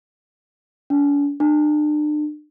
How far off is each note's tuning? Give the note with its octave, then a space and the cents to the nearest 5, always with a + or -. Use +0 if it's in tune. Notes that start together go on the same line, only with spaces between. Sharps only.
D4 -45
D4 +40